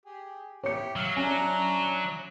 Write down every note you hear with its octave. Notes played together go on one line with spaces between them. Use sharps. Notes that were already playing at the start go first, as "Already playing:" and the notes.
G4 G#4
E4 G4 C#5 C#7
F#3 E5 F5
C#4 D4 E4 A#5